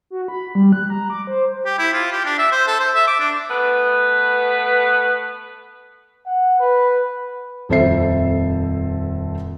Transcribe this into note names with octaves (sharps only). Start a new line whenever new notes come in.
F#4
B5
G3
F#6
A#5
D6
C5
G4
E4
F4
G4
D4
E5
C5
A4
C5
E5
D6
D4
A3 B3 B4
F#5
B4
D#1 F2 A4 C5 E5 C7